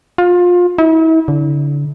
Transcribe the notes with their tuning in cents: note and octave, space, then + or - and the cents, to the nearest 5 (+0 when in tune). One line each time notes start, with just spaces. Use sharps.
F4 +25
E4 -40
D3 -35